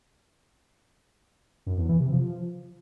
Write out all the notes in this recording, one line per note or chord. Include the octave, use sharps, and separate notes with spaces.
F#2
E2
E3
C3
F3